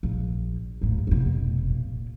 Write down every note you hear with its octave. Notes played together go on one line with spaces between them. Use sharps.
A#1
D#2 A2
F1 B2
A#2